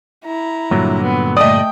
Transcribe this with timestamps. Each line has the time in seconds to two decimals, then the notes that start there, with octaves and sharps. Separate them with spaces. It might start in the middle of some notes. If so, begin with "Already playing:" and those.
0.25 E4 A#5
0.71 G2 A#2 D3 F#3
1.03 B3
1.37 A3 D5 D#5 G5 D#6